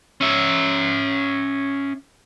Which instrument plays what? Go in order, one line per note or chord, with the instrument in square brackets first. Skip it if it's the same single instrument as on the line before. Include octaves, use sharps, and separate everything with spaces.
[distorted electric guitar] C#4 E5